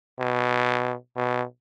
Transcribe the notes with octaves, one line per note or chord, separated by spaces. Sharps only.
B2
B2